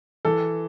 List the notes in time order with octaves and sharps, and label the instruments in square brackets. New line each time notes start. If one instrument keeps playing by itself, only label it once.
[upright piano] E3 A4